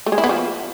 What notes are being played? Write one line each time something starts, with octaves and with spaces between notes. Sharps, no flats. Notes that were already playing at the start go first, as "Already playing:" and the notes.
A3
G#3
E4
B3
F3